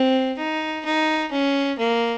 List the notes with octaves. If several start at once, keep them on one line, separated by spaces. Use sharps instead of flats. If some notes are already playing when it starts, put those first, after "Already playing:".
Already playing: C4
D#4
D#4
C#4
A#3